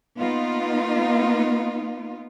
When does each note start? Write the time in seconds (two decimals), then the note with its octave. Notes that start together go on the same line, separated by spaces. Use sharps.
0.18 A#3 B3 D#4 F4